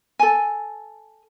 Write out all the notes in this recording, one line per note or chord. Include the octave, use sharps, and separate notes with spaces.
A4 G#5